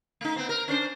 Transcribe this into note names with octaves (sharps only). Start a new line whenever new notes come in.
A3 D#4
B3 C4
A#4
C#4 D4 C5